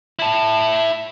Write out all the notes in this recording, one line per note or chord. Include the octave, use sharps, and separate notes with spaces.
E4 A5